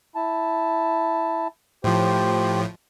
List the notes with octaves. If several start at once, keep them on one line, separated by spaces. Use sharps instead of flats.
E4 A5
A2 F3 G4 C5